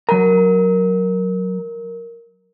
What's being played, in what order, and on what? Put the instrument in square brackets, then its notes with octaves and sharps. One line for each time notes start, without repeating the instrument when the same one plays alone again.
[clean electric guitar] F#3 A#5 [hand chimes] A#4